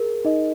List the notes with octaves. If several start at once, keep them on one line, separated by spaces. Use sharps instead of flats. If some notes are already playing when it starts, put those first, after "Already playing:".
Already playing: G#4 A#4
D#4 D#5